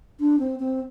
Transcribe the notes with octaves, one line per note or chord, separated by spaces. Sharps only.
D4
C4
C4